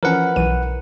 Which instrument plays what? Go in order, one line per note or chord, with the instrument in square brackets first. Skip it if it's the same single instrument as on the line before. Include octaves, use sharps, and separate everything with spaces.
[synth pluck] E3 F3 C#4 [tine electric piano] A#4 B4 F#5
[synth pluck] B1 E3 D#7